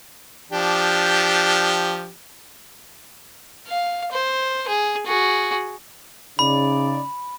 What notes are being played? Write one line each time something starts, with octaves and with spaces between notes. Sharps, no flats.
F3 D4 G4
F5
C5
G#4
F#4 G#4
C#3 D#4 D5 B5